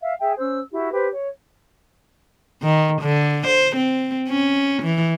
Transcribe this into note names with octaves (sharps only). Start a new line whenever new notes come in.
E5 F5
G#4 E5 G5
C#4 C5 E6
E4 F#4 G4
G4 B4 C5
C#5
D#3
D3
C5
C4
C#4
E3